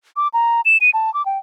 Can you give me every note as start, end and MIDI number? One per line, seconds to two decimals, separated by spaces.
0.17 0.28 86
0.34 0.61 82
0.65 0.77 100
0.81 0.90 99
0.94 1.13 81
1.14 1.25 86
1.26 1.38 79